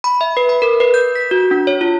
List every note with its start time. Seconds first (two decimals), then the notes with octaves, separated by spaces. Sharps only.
0.04 B5
0.21 E5
0.37 B4
0.49 B5
0.62 A#4
0.80 B4
0.94 G6
1.16 B6
1.31 F#4
1.51 D4
1.67 C#5
1.81 F4